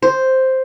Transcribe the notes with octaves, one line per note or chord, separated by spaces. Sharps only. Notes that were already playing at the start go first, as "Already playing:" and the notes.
C5